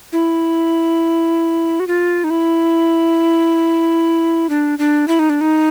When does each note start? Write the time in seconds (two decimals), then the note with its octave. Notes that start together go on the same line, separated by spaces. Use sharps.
0.13 E4
1.80 F#4
1.87 F4
2.24 D#4
2.30 E4
4.49 D4
4.79 D4
5.08 E4
5.19 D#4
5.30 D4
5.41 D#4